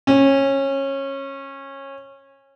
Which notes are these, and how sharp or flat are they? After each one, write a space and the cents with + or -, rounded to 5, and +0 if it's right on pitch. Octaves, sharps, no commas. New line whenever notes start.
C#4 -20